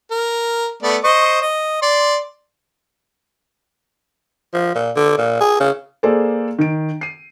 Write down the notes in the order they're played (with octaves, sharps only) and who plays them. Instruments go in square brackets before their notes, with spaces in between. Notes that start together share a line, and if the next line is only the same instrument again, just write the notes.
[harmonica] A#4
A3 B3 D5
C5 D#5 C#6
D#5
D5 C6
[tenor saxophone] F3
A#2
D3
A#2
G#4
C#3
[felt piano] A#3 G#4 A4 C5 D5
D#3 D7
C7 D#7